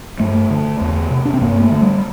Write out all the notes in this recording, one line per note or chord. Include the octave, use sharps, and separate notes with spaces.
G2 A3
D3
E2
C3
D4
C4
G2 A#3
A3
D3
G3